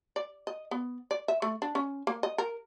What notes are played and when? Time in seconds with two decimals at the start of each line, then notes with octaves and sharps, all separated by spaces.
0.16 D5
0.47 D#5
0.71 B3
1.11 D5
1.28 E5
1.42 A3
1.62 D4
1.75 C#4
2.07 A#3
2.23 D#5
2.38 A#4